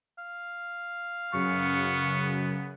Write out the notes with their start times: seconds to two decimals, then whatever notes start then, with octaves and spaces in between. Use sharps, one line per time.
0.18 F5
1.33 F#2 C#3 B3 C#6